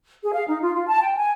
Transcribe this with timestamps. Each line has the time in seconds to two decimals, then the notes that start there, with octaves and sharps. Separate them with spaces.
0.23 G#4
0.35 F5
0.48 D#4
0.62 F4
0.74 F4
0.86 A5
1.00 G5
1.16 G#5